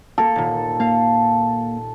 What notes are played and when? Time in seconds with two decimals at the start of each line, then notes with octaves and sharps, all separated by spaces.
0.18 A#3 A4
0.36 D#1 A#2
0.80 A#3 F5